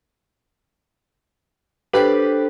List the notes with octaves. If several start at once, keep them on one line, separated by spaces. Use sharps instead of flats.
D4 G4 A4 B4 C5